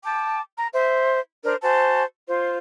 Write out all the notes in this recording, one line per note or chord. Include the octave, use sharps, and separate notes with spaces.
G5 A5 D6
A#5
C5 E5
D4 A#4 C5
F#4 C5 G#5 A5
F4 C5